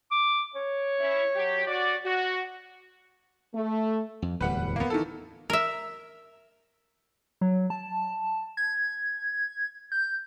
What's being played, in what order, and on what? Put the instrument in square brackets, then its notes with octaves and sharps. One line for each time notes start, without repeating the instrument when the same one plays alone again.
[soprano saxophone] D6
C#5
[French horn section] C#4 E4
F#3 G4
F#4 D5
F#4
A3
[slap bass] F2
[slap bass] D1 E2 G3 [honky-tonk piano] B4 F#5
[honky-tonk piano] A#3 B3
D#3 E3 A4
[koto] A#4 E5
[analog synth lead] F#3
A5
G#6
G6